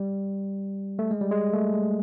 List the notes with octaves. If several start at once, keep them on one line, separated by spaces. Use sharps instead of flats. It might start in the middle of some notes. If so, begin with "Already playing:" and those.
Already playing: G3
A3
G#3
G3
G#3
A3
G#3